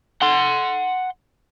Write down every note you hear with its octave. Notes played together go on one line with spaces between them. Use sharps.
F#5 C6